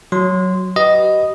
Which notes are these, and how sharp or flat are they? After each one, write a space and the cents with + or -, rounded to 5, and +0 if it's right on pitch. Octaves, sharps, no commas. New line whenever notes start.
F#3 +0 C6 -15
G4 -40 B4 +0 D#5 +0